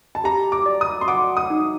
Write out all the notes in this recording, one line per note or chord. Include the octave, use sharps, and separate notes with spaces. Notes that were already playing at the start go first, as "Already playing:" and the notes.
A5
G4 A#5
D6
D5
D#6
C6
F#5 D6
D#6
D#4